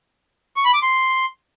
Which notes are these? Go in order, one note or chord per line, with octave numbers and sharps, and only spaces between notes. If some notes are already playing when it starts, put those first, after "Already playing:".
C#6
B5
D6
C6